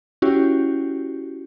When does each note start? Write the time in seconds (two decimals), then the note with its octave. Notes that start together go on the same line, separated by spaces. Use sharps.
0.22 C#4 E4 F#4 G4